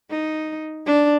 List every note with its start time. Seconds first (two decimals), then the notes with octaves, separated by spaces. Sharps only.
0.10 D#4
0.86 D4